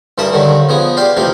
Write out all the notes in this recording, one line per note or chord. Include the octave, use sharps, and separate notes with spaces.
G2 E3 A#4 A5 B5 D#6
G2 D3 D#3 F#3
F3 B3 G#4 D#5
G4 C5 D5 F5
A1 C3 F3 D#4 G4 F5